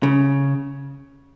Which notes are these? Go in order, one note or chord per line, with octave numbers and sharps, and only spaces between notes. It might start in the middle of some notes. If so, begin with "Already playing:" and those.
C#3